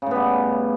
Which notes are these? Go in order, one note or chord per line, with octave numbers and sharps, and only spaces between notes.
A2 C#3 G3 B3